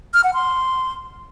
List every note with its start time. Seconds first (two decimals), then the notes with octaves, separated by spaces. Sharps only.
0.14 F6
0.24 F#5
0.34 C6